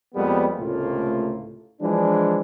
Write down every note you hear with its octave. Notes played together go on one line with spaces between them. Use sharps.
F2 G3 G#3 A#3 B3
C#2 A2 C3 A3 A#3 F4
E3 F3 G#3 D4